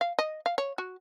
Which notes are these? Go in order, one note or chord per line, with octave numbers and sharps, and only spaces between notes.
F5
D#5
F5
C#5
F#4